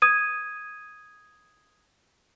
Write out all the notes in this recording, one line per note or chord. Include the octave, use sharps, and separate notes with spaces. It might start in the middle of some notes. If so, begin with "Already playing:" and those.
D#6 G#6 D#7